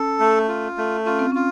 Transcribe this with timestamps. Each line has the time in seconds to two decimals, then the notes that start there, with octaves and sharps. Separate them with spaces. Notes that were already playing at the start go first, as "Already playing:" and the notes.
Already playing: C#4 A4
0.20 A3
0.48 F4
0.78 A3
1.06 C#4 F4
1.19 C4
1.32 C#4 F4